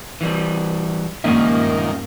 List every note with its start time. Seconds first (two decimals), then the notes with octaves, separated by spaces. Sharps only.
0.21 E3 G3
1.24 G2 A#2 D#3 G#3 A#3 C#4 E5